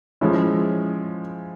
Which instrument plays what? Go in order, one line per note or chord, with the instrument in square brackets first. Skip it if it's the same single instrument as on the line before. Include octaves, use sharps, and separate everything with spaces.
[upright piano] F3 G#3 C#4 E4